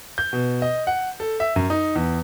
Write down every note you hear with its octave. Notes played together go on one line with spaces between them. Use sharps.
G6
B2
D#5
F#5
A4
E5
F#2
D#4
E2